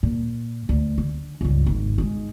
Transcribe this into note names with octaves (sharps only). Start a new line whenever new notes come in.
A#2
D2
D3
C#2 G2
G#1 G#2
G#2 G#3